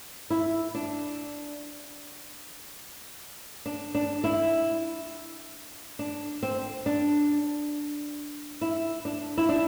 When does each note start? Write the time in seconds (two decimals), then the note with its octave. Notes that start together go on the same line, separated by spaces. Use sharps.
0.30 E4
0.75 D4
3.66 D4
3.95 D4
4.24 E4
5.99 D4
6.43 C4
6.86 D4
8.61 E4
9.05 D4
9.38 E4
9.49 D4